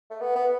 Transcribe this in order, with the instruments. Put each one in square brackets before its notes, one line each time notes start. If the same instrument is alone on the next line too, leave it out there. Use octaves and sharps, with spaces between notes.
[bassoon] A3
B3
B3